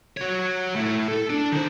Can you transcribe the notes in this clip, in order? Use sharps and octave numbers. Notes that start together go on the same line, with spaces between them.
F#4 C#5
A3 E4
A4
D4
D#3 C5